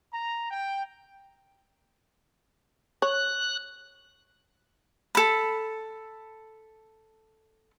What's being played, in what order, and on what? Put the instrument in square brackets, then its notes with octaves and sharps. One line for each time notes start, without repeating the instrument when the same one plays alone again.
[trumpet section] A#5
G5
[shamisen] C#5 [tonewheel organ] F#6
[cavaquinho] A4 B5